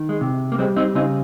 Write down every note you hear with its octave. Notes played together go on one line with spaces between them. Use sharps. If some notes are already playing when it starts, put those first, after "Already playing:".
Already playing: D#3
G#3
C3
A#3
G3 G#3 C4
C4 D#4
C#3 C4 D#4